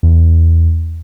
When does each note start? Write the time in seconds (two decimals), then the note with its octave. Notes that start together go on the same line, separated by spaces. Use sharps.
0.03 E2